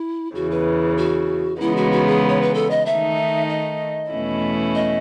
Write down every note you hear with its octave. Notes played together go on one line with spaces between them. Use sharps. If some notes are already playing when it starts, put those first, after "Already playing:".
Already playing: E4
E2 C#3 E3 F#4
B4
F#4
C#3 E3 G#3 B3 D#4 E4
F#4
F#4
G#4
C#5
B4
A4
D#5
D#3 A3 D#4 E5
D#5
E2 B2 A3 C#4 E4
D#5